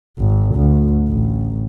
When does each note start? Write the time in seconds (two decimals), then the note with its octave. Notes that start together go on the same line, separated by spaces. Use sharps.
0.18 G#1
0.56 D2
1.09 A1